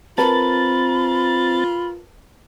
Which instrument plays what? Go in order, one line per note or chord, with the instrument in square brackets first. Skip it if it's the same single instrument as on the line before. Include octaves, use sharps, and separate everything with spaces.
[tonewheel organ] C4 A6 [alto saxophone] F4 [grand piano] A#4 B4 A5 [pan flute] B5